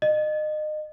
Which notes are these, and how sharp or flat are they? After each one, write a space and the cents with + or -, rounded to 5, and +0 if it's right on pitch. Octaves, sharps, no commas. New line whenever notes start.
D#5 -30